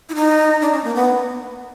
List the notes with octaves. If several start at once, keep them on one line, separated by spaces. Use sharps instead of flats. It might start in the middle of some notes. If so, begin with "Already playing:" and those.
E4
D#4
D4
C#4
A#3
B3